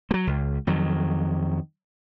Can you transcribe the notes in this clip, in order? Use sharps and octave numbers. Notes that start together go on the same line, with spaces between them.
F#3 A3
C#2
F2 D#3 F#3